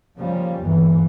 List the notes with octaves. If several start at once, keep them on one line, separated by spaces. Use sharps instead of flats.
C#3 F3 G3 A#3
G1 D#2 G#2 E3